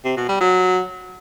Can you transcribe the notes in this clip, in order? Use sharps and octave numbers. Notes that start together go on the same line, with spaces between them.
C3
B2
G3
F#3